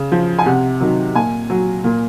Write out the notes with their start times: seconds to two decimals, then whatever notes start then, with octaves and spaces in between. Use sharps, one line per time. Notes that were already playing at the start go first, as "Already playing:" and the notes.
Already playing: C#3
0.12 F3
0.39 G#5
0.46 C3 F#5
0.81 D#3 F#3
1.15 A#2 G#5
1.50 F#3
1.84 A#2